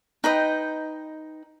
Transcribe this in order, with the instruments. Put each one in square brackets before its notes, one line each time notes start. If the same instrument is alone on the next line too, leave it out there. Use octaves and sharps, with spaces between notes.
[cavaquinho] D#4 B4 D#5 G5